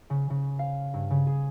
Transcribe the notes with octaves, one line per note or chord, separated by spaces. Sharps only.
C#3
C#3
F5
G2
C#3
G#4